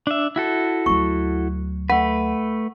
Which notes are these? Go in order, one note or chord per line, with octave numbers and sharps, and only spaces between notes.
D4 E5
E4 F#4 A4
D2 F#3 C#6
A3 B4 F#5